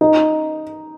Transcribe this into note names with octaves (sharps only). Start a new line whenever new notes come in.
D#4